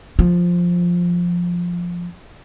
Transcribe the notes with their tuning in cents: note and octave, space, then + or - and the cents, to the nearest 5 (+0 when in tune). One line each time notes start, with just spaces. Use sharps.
F3 +5 F4 -5